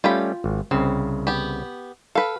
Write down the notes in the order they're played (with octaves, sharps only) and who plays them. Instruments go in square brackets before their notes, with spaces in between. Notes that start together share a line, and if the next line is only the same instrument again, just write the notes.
[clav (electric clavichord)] G3 A3 C#4 [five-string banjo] F4 G5 B5
[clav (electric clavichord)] G#1
[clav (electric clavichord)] C2 C#3 [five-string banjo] C4
[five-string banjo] B3 G4
[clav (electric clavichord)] A4 [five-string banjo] B4 F5